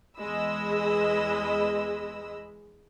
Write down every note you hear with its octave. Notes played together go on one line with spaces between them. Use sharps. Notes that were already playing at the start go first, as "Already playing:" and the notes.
E2 G#3 D#5 B5 E6